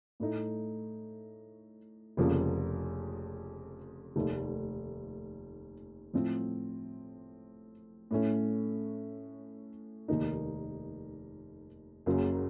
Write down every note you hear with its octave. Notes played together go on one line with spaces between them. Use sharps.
A2 A3 D#4
F1 F2 C#3 F3 A#3
F1 D#2 D#3 A3
A2 F3 C4
A2 A3 C#4
F1 D#2 D#3 A#3 D#4
F#1 F#2 C#3 F#3 A#3